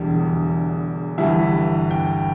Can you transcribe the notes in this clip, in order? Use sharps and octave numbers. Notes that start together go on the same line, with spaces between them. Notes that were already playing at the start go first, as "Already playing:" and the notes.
Already playing: E1 E2 D3 G3
G1 G2 E3 G3 E5
G5